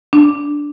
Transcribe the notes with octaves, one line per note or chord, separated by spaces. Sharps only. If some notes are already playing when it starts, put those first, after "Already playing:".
D4